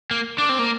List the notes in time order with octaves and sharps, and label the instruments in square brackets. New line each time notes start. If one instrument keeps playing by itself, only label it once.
[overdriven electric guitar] A#3
[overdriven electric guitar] D4 [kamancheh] D6
[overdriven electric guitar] C4
A#3